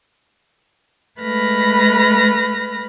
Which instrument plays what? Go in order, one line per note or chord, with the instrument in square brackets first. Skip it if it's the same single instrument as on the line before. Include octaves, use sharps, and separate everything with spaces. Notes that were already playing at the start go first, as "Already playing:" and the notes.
[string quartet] G#3 A3 B4 B5 F6 A#6